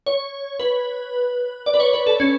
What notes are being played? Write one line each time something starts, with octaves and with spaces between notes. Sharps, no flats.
C#5
B4
D5
B4
C#5
B4
A4
C#4